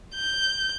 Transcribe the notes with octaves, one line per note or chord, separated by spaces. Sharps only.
G6